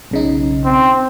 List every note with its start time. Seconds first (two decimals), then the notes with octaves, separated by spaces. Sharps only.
0.11 B1 C#3 D#4
0.65 C4